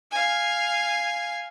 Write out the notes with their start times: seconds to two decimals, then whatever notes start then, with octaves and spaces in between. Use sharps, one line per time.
0.11 F5 G#5